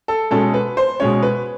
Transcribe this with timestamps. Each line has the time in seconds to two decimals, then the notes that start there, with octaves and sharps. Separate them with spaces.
0.08 A4
0.31 B2 G#3 C#4 A4
0.54 B4
0.77 C5
1.00 B2 G#3 C#4 C#5
1.23 B4